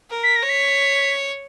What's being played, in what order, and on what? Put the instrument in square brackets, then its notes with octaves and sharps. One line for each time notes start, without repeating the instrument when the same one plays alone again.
[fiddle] A#4
[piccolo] B6
A#6
[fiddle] C#5
[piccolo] B6